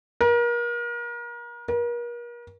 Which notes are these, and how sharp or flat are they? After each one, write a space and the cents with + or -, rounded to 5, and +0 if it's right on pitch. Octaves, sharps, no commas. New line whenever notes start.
A#4 +35
A#4 +40